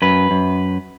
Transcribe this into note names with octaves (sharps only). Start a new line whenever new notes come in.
F#2 B4
F#2